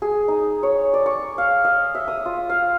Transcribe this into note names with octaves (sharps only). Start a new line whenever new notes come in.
G#4
D#4
C#5
D5
C#6
F5
D#5
E5
D#6
F4
F5